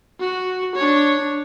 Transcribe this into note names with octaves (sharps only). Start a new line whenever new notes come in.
F#4
D4 C#5